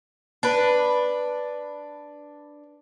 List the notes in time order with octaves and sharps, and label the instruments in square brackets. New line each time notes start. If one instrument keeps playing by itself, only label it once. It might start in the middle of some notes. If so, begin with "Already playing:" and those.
[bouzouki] D4 B4